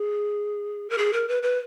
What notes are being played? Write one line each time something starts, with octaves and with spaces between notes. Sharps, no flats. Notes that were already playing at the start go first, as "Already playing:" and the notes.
Already playing: G#4
A#4
G#4
A#4
B4
B4